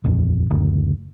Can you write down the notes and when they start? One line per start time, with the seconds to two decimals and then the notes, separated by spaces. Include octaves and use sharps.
0.04 D#1 A#1 F2
0.50 F#1 D2